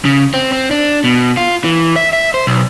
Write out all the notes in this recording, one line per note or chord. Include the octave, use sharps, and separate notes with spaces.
C#3
C4
C4
D4
B2
F4
E3
E5
E5
C5
B1